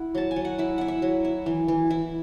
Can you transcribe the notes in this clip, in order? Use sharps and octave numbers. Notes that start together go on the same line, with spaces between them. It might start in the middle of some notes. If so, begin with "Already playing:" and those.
Already playing: E4 F#5
F#3 A5
G#5
F#3
F#5
E4 E5
E4 F#5
E5
F#3
E4
E3
E3
E4